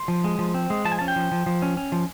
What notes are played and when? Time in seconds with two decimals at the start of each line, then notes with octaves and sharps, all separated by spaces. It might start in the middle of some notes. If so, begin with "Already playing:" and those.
Already playing: C6
0.08 F3
0.24 G#3
0.39 F3
0.54 C4
0.70 G#3
0.85 F3 A5
0.92 G#5
0.99 C#4 A5
1.08 G5
1.16 F3
1.32 F3
1.46 F3
1.62 C#4
1.77 C#4
1.92 F3